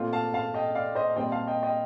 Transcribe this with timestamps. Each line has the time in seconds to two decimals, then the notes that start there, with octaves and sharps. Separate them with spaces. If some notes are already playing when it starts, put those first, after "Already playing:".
Already playing: A#2 A3 C4 F4
0.13 F5 A5
0.34 F5 A5
0.54 D#5 G5
0.75 D5 F5
0.95 C5 D#5
1.16 A#2 G3 C4 D#5 G5
1.32 F5 A5
1.47 D#5 G5
1.63 D#5 G5